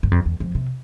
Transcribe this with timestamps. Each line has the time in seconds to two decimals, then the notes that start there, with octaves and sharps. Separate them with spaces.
0.03 G2
0.11 F2
0.26 E2
0.40 F2
0.55 C3